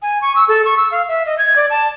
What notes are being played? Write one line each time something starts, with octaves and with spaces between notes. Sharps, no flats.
G#5
C#6
E6
A4
C#6
E6
F5
E5
D#5
G#6
D5
A5